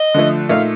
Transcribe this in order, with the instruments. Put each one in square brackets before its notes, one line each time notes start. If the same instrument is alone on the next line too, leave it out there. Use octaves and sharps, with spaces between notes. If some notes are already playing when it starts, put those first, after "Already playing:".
Already playing: [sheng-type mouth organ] D#5
[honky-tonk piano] D3 F3 A3
[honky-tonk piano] A#2 A3 D#4 [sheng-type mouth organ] F5